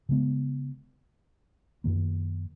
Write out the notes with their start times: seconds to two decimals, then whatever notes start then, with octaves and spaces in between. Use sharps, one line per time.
0.09 C#3 G#3 B3
1.84 F#2 D#3 A#3